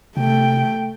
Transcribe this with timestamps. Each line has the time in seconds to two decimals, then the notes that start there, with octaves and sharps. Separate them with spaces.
0.17 C3 A3 G5